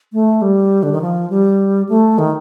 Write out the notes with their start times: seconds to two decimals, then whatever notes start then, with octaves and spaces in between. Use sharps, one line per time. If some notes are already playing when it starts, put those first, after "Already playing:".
0.13 A3
0.42 G3
0.83 D3
0.92 D#3
1.02 F3
1.30 G3
1.89 A3
2.18 D#3